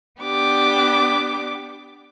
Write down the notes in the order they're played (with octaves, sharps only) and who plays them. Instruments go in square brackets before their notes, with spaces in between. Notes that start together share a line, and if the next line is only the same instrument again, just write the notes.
[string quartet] B3 D4 G4 D6